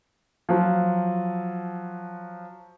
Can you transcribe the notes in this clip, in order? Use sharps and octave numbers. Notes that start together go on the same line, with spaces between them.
F3 F#3